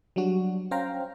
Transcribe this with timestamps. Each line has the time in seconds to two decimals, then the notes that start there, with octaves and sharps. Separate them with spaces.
0.16 F#3 G3 D4 F#4
0.71 C#4 C5 F5 G5 A#5